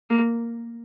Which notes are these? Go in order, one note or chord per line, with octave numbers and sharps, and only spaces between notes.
A#3